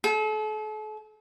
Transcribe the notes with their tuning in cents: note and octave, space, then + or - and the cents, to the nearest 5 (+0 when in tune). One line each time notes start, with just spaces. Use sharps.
A4 -40